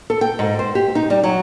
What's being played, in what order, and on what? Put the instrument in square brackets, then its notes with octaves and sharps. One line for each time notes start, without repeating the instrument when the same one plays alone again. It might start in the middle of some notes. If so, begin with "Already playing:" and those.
[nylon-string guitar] A4
G5
G#2
C5
G4
D#4
G3
F#3